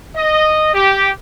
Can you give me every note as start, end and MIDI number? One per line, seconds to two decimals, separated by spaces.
0.16 0.74 75
0.74 1.11 67